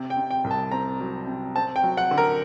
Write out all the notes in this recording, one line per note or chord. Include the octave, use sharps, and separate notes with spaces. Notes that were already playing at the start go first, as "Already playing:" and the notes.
Already playing: C3
G5
C3
G5
C2
A5
C4 A#5
F#3
C3
C4 A5
G5
F#3
F#5
D3
A#4